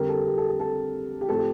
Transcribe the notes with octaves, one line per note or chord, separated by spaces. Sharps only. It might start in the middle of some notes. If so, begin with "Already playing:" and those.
Already playing: F2 D3 G3 G4 A#4
A4
G4
A4
A4
A4
G4
A2 F3 C4 A4
G4